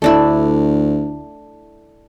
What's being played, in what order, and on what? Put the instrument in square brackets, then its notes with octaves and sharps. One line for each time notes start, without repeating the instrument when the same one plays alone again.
[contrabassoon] D2 [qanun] A3 D4 E4